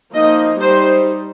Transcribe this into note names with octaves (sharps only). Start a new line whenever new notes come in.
F3 A#3 D#4 D#5
G3 D#4 C5